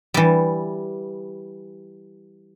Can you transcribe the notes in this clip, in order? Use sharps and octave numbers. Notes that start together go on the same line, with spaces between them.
E3 G3